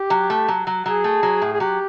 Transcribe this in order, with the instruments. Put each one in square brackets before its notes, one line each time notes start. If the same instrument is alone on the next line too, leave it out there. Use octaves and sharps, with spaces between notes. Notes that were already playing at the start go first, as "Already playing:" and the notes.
Already playing: [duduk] G4
[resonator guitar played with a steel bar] F#3
A3
F#3
F#3
[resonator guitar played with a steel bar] F#3 [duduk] G#4
[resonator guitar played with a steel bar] A3
F#3
A2
[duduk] G#4
[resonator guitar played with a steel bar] F#3 [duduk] G4